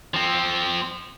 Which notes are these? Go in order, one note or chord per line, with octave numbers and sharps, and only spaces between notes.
F3 C4